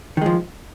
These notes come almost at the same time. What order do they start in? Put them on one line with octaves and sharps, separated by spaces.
D#3 G#3 F3